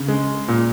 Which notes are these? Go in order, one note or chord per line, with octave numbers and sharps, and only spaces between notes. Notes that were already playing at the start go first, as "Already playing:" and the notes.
Already playing: C#3
G#3
A#2